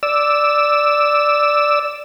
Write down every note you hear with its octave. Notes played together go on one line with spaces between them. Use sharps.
D5 E6